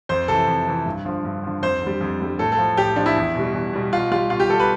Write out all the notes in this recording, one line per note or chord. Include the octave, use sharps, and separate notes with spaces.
F2 C5
C3 E3 A4
F2
C3 E3
G2
D3 F3
G2
D3 F3
F2 C5
D3 G3
F2
D3 G3
A2 A4
A4
F3
A2 G4
F3 D4
E4
E2
B2 G3
E2
B2 G3
B2 F4
G3 F4
B2 F4
G4
G3 A4
B4